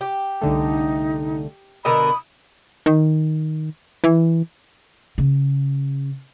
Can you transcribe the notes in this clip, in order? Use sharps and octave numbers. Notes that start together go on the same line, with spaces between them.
G4
C2 D3 A3 D#4
B2 D3 A#4 B5 D#6
D#3
E3
C#3